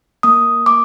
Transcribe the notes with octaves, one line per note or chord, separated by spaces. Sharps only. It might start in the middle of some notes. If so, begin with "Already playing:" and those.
A#3 D#6
A#3 D6